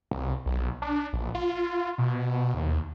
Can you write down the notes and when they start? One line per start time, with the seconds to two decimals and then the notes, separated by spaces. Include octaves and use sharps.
0.11 C2
0.46 B1
0.82 D4
1.13 A#1
1.35 F4
1.98 B2
2.54 D#2